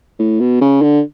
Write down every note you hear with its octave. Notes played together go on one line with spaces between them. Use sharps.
A2
B2
C#3
D3